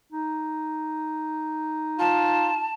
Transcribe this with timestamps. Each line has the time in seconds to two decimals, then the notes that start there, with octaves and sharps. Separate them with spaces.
0.12 D#4
1.99 F4 A5